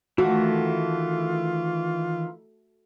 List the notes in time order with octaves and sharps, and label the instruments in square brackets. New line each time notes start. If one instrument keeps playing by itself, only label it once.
[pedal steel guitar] D#3 E3 [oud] A3 [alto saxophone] F4 [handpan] F#4